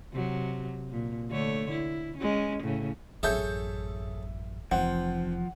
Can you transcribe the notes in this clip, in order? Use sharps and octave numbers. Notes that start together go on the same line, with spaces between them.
C3 F#3
A#2
D3 A3 C#5
E4
G#3 C#4
A2 C#3
A1 F#2 G#4 A4 C#5 E5 G6
F1 E3 F3 C4 F#5